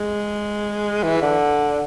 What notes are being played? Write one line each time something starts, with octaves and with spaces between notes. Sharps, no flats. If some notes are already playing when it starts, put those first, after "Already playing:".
Already playing: G#3
E3
D3